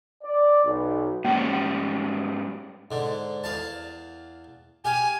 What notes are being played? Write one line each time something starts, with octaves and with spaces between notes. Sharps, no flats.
D5
B1
G#2 G3 A#3 C#4
G#2 D3
E2 F5 A5
G4 F5 G#5